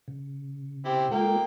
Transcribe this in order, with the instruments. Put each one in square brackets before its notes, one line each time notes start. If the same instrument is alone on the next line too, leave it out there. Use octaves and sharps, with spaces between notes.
[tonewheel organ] C#3
[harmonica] C4 E4 G4
[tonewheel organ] G#3 F4 A4 [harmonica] A#3 G5